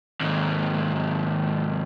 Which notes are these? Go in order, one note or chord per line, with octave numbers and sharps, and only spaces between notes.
D#2 G#2